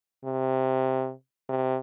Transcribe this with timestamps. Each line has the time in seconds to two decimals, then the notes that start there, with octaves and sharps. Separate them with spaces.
0.24 C3
1.49 C3